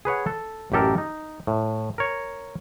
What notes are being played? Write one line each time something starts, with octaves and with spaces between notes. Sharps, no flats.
G#4 B4 C#5 F#5
A4
A1 F#2 G4 A4 A#4
D#4
A2
A#4 C#5